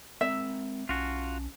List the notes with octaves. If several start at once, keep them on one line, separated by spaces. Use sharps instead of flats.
G#3 C4 A#4 E5
B1 C#4 F4 F#4 A5